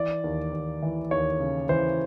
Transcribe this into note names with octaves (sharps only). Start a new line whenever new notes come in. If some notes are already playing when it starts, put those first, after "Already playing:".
Already playing: E3 D5
D#2
D#2
E3
D#2 C#5
C#3
E3 C5